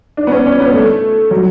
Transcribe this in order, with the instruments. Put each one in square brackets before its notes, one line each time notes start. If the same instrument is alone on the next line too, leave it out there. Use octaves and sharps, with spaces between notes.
[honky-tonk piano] D4
B3
C#4
C#4
B3
A3
F#3